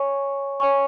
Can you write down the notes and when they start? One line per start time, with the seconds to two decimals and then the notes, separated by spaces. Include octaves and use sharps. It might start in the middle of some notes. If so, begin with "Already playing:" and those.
Already playing: C#5 G#5 C#6
0.60 C#5 G#5 C#6